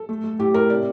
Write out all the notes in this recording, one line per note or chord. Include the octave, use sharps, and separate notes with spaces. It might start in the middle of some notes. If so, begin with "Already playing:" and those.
Already playing: A4
A3
A3
A2 G4
A2 A#4
C3 D5